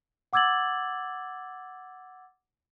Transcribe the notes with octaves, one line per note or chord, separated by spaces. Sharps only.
F#5 D6 E6 G#6 A6 F#7